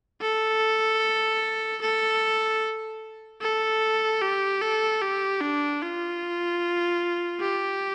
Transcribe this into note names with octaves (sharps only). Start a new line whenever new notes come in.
A4
A4
A4
G4
A4
G4
D4
F4
G4